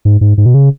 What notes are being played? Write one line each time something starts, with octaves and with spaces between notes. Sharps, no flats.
G#2
G#2
G#2
B2
C#3